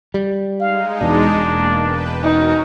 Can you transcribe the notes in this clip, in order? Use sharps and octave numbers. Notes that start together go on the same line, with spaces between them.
G3
G#3 D#4 F5
E2 B2 D4
E1 A#3
B4 G5 A5
C#4 D#4 F#4 A#4